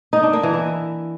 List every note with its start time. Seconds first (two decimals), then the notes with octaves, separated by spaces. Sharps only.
0.13 D#4
0.23 D4
0.33 A#3
0.43 E3
0.54 E4